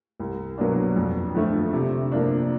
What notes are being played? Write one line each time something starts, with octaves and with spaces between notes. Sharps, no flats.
C2
B2 F#3 A#3 D4
F2
D3 F3 A3
C3
F3 A#3 D4